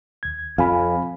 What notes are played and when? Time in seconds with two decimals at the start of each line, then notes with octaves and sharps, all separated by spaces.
0.23 D#2 G#6
0.58 F2 F5 G#5 B5